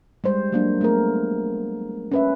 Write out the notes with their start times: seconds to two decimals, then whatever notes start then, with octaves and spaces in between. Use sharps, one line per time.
0.24 G3 G#3 C5
0.52 F#3 A#3 D4
0.81 A3 B3 G#4 A#4
2.12 C#4 B4 E5